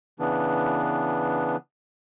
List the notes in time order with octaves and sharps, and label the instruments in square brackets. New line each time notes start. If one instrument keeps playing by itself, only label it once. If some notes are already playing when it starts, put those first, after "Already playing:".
[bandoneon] C#3 E3 B3 D4